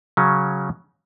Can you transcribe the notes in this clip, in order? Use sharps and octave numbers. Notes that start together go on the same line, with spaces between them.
C#3 F#3 C#4